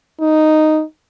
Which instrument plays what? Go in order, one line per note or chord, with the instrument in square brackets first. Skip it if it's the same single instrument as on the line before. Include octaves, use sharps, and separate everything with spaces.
[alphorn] D#4